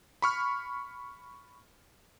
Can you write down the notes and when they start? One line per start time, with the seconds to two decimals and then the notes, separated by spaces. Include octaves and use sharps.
0.22 B5 C#6 F6